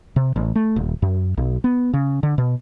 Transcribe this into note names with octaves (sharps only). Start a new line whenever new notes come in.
C3
A1
A3
D#1
F#2
B1
B3
C#3
D3
B2